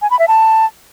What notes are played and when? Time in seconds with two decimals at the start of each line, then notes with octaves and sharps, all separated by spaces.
0.02 G#5
0.10 B5
0.19 E5
0.28 A5